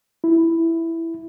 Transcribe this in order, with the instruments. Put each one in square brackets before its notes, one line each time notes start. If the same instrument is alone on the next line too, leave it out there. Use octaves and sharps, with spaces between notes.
[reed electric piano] E4